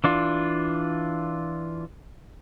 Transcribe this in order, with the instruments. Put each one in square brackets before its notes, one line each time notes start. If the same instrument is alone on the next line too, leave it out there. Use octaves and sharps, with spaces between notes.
[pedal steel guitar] E3 D4 F4